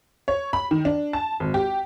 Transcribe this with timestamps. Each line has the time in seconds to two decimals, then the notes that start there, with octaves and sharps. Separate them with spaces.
0.28 C#5
0.53 B5
0.71 D#3
0.85 D4
1.13 A5
1.40 G#1
1.54 G4